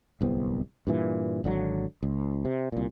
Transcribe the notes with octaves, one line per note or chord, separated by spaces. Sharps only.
D1 C2 B3 C4
G2 A#2 E3
G#1 D3 F3 F#3
C#2
C3
C2 A#2